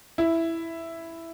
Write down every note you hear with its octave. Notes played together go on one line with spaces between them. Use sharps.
E4